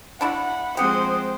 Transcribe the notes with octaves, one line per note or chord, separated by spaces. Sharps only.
D4 E4 F#4 F#5 B5
F3 G#3 C4 G4 C5 F#5 G5 D#6